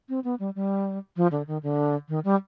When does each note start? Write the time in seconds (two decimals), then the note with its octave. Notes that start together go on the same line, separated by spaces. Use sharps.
0.09 C4
0.24 B3
0.40 G3
0.55 G3
1.17 F3
1.32 D3
1.47 D#3
1.63 D3
2.09 D#3
2.24 G3